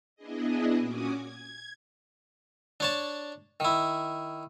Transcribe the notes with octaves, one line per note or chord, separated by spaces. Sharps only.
B3 D4 E4 G#4 D#5
A#2 C#4 F#4 G#5 D6 D#6
G#6
D4 C#5 A5
D#3 E4